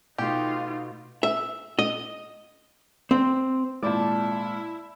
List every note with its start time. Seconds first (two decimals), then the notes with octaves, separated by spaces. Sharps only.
0.18 B2 A3 D#4 F4 G4
1.23 E5
1.79 D#5
3.11 C4
3.83 G#1 A#2 G#3 C4 E4 D5 A5 G6